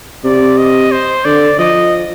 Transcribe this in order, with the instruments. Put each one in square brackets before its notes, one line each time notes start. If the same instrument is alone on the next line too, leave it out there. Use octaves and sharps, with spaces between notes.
[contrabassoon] C3 [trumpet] D5
[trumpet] D#5
C5
[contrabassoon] D3 [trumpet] D5
[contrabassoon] F3 [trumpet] D#5